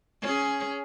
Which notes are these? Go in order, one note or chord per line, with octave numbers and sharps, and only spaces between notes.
C#4 G#4